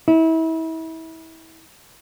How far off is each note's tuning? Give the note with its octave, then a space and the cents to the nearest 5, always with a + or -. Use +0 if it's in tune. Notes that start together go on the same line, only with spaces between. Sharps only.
E4 -30